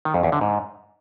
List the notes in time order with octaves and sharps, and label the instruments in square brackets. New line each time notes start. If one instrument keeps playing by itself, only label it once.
[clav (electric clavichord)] D#3
F2
E2
D3
G#2